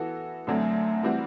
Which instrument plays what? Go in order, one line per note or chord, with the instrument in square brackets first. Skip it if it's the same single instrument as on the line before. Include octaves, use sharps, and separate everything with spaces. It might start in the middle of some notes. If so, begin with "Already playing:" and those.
Already playing: [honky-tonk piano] E3 B3 F#4 A4
[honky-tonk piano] F#2 D3 F#3 C4 [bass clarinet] A3
[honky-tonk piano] E3 G3 C4 F#4